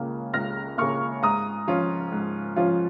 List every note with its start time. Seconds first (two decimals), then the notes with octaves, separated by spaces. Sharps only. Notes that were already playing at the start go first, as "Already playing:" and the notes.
Already playing: C#2 C#3 A#3
0.34 C#2 F6 A#6
0.78 C#3 A#3 C#6 F6
1.22 G#2 A#5 D#6
1.67 F3 C#4 F4
2.12 G#2
2.56 F3 C#4 F4